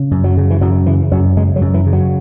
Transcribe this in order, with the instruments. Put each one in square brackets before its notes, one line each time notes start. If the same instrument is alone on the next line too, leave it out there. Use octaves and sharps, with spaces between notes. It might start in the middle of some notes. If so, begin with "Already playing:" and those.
Already playing: [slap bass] C#3
F#2
F#3
C#3
E3
F#2 F#3
C#3 E3
F#2 F#3
C#3 G#3
F#3
F#2
E3
C#3
F#3